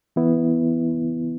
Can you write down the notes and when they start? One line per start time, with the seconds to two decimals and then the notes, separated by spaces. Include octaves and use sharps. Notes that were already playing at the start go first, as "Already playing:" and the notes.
0.16 E3 B3 E4